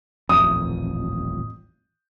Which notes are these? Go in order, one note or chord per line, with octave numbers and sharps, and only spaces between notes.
D#1 A1 F2 D#6